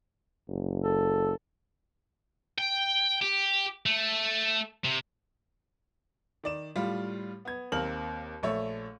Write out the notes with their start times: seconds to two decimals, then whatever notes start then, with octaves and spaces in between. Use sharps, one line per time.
0.48 F#1
0.84 A4
2.58 G5
3.21 G4
3.86 A3
4.85 C3
6.44 D#3 D5 E7
6.76 A2 G3 F4
7.45 B3 G#6
7.72 D#2 A#3 C4 F6 F#7
8.43 A#1 A3 C#5 E5